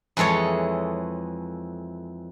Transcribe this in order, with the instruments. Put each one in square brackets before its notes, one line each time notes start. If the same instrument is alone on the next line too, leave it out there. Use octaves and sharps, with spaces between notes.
[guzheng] F2 E3 G#3 A4 C#5